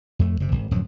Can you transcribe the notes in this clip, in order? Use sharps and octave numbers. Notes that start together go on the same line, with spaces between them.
F2 A3
F#1 C3
G#1
D1 F#2 F3 F#3